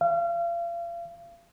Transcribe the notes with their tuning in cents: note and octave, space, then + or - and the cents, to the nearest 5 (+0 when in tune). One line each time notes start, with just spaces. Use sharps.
F5 -35